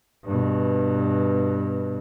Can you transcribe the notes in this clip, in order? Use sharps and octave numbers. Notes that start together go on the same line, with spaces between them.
G2 B2